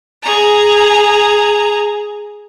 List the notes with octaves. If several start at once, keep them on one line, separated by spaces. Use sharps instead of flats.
G#4 A#5